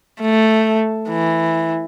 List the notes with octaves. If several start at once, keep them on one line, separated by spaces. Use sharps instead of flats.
A3
E3